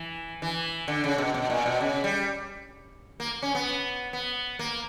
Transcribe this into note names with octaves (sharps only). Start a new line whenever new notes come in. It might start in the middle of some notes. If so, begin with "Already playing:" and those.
Already playing: E3
E3
D3
C#3
B2
B2
A#2
B2
C#3
G3
A#3
C#4
B3
B3
A#3